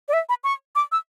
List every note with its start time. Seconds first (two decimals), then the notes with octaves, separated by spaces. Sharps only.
0.08 D5
0.13 E5
0.29 B5
0.44 C#6
0.75 D6
0.92 E6